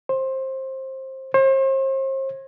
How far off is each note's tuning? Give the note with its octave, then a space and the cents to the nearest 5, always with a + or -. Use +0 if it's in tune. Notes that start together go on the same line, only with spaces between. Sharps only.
C5 +20
C5 +40